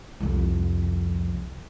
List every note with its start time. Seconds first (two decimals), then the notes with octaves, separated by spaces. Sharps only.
0.20 C2 F2